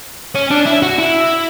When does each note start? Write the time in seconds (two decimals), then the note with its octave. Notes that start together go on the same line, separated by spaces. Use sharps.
0.35 C#4
0.51 D4
0.66 E4
0.83 F#4
0.98 E4